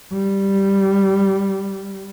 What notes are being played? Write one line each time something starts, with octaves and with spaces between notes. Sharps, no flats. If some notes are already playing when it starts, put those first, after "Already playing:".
G3